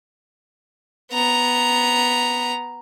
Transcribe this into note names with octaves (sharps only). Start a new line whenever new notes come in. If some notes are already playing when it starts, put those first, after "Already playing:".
B3 A#5